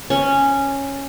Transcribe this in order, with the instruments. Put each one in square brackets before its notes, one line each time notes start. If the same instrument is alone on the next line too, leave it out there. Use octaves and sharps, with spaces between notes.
[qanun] C#4